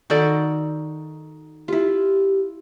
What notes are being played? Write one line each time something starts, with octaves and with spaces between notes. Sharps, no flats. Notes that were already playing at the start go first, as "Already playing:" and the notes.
D#3 D#4 F#4 A4 D5
E4 F4 G4